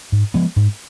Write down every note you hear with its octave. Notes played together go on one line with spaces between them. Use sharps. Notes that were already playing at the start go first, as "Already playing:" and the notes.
G#2
F3 G#3 B3
G#2